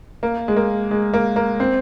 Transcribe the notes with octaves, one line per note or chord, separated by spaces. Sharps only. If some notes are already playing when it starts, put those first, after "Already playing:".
A#3
G#3
A#3
G#3
A#3
A#3
C4